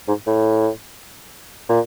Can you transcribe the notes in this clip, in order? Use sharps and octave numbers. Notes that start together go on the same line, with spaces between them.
G#2
A2
A#2